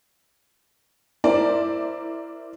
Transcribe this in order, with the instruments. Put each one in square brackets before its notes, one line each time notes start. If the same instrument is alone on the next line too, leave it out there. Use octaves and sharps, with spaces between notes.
[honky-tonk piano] E4 A#4 C5 D5